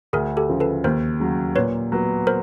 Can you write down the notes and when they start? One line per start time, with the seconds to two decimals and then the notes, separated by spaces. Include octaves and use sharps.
0.13 D2 G#4 A#4
0.37 G4 A4
0.50 C#3 F3
0.60 A4 B4
0.84 D#2 A#4 C5
1.20 C#3 F#3
1.56 A#2 B4 C#5
1.92 F#3 B3
2.27 A#4 C5